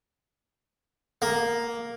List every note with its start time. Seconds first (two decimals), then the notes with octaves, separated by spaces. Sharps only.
1.22 A#3